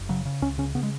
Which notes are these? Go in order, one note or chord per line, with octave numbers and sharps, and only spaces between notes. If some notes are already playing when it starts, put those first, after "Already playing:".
Already playing: F#1
C#3 F#3
C#3
C#2 C#4
C#3 C#4
C#3 B3
G#3